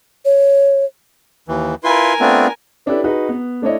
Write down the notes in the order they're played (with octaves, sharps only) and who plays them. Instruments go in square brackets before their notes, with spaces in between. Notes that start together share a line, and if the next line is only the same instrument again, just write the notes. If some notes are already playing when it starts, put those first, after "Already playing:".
[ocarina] C#5
[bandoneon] D#2 E3
[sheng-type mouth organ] E4 B4 C6 [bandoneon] F4 [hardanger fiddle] A#4 G#5
[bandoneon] A3 C4 [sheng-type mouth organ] B3 D4 F4
[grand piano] C#4 D4 E4 G4 A4 B4
D#4 F#4 G#4 B4
B3
A3 D4 E4 C#5 D#5